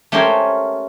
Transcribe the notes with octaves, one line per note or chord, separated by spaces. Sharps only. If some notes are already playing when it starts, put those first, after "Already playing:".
A3 C#4 G4 A#4 C5 G#5